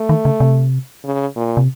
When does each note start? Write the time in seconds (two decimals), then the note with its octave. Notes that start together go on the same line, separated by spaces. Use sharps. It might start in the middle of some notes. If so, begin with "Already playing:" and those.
Already playing: A3
0.09 D#3
0.25 C#3
0.40 C3
1.04 C#3
1.36 A#2
1.57 C3